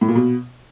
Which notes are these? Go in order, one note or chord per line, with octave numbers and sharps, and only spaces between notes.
A2
A#2
B2